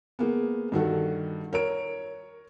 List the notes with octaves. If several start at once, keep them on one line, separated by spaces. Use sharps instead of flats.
G#3 A#3 B3
G2 D#3 F#4 A4
A#4 C#5 D7